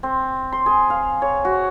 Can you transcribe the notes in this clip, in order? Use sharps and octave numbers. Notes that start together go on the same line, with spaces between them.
C4
C6
G#4
F5
C#5
F#4